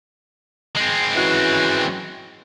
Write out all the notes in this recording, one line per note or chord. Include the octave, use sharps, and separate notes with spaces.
G#3 C4
E3 C#4 F#4